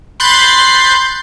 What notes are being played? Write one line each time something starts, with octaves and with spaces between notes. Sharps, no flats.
B5 C6 F#6 G6 A6 C7